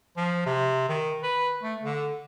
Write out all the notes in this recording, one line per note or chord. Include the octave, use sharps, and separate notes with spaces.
F3
C3
D#3
B4
A3
D3